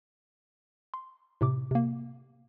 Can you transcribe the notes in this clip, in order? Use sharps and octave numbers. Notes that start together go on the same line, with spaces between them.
C6
A2 C3 D6
C3 A#3